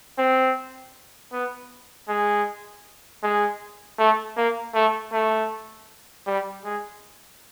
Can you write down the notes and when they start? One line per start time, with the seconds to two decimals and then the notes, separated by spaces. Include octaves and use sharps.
0.18 C4
1.33 B3
2.09 G#3
3.23 G#3
3.99 A3
4.37 A#3
4.75 A3
5.12 A3
6.27 G3
6.65 G#3